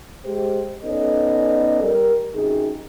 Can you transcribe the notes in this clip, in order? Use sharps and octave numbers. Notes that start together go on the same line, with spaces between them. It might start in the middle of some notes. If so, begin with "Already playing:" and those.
G#3 G4 C5
B3 C#4 D#4 A4 D5 D#5
G3 A#4
F#2 C3 D#4 G#4